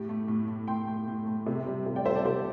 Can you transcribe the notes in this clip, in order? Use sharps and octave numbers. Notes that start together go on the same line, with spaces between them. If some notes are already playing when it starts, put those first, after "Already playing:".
Already playing: A2 G4
A3
A2
A3
A2 G5 C6
A3
A2
A3
C3
G3
C3
D5 G5
G3 C5 E5
A4 D5
C3 G4 C5